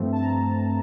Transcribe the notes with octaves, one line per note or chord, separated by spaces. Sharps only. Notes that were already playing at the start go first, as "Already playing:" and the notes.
Already playing: G2 F3 A3 C4
A5
A#5